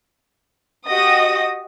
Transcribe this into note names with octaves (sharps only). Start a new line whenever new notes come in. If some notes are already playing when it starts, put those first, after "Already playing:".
F#4 G4 D#5 D#6 A#6